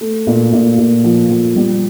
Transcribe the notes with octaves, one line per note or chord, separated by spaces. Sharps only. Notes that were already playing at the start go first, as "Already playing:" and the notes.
A3
A#2
A#2
A#2
F3
F3
G3